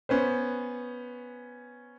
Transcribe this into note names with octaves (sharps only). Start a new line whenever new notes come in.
B3 C#4 B4 C5